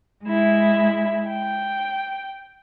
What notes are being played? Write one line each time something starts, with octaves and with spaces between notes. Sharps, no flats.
G#3 E4
G5